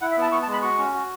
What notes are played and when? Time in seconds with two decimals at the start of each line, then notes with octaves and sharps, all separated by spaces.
0.01 E4 F#5
0.11 E5
0.17 B3 A5
0.32 B3 C#6
0.42 A5
0.47 G#3
0.53 B5
0.62 F#4 C#6
0.78 C#4
0.94 F#4